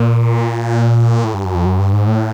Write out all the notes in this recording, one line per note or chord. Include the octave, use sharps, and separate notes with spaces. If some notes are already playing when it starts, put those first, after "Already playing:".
Already playing: A#2
A2
G2
F#2
F2
F#2
G2
G#2
A2